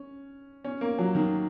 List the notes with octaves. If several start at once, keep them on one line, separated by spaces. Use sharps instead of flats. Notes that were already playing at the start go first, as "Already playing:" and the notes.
Already playing: C#4
C#4
A#3
F#3
D#3